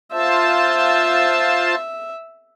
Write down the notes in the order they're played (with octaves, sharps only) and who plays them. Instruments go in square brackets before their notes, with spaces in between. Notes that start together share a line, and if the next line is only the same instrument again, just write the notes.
[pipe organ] F4 C5 A5 [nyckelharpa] E5